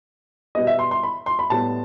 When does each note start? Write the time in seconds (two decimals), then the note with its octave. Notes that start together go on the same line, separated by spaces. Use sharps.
0.55 B2 G3 B3 D#5
0.67 E5
0.79 C6
0.91 C6
1.03 B5
1.26 C6
1.39 B5
1.50 A2 G3 B3 A5